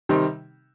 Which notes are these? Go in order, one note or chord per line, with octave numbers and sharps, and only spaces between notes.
C3 D#3 G3 C4 D#4